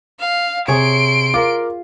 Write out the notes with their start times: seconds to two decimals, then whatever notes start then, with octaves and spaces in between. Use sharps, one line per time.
0.20 F5
0.68 C3 G#4 C#5 C6 D7
1.34 F4 A#4 D6